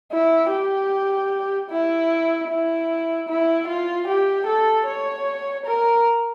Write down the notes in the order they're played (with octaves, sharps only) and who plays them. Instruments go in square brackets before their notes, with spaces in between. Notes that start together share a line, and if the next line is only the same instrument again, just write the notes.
[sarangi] E4
G4
E4
E4
E4
F4
G4
A4
C#5
A#4